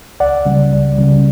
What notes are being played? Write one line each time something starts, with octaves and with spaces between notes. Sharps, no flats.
C#2 D5 F#5
C#3 G3 C#4
C#2
C#3 G3 C#4